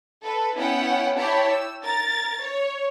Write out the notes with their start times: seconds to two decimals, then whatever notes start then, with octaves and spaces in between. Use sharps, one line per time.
0.23 A4 B4
0.55 B3 C#4 E4 F#5 G5
1.17 E4 G4 C#5 G5 A5 B5
1.50 E6
1.84 A#4 A6
2.41 C#5